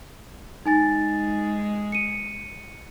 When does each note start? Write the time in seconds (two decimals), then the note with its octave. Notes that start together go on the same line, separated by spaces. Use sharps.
0.66 G#3 D#4 G#5 A6
1.92 C#7 D#7